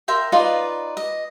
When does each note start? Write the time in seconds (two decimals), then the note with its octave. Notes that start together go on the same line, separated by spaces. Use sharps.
0.08 A#4 E5 G5 C6
0.32 D#4 F4 B4 D5
0.97 D#5